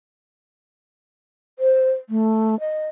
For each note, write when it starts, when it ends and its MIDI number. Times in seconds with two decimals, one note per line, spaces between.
1.59 1.90 72
2.09 2.58 57
2.60 2.88 75